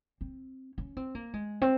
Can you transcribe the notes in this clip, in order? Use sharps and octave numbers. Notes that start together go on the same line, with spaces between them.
C4
C#4
C4
A#3
G#3
C4